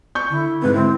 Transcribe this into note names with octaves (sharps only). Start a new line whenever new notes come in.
C#6 G6
D3 E4
G#2 C4 B4
C4 E4